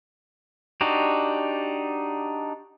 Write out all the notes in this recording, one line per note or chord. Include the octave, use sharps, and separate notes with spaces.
D4 D#4 F#4 G4